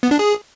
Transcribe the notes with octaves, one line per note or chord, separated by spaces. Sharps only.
B3
D4
G#4